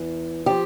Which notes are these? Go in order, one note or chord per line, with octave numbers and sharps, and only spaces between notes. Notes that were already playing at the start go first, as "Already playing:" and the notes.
Already playing: E2 E3
F3 G4